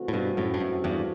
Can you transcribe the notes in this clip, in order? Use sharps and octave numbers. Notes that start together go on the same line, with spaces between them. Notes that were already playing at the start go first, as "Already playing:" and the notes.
Already playing: C3 E3 A3 C4 F#4
A2
G2 B2
F#2 A2
G2
F#2
E2 G2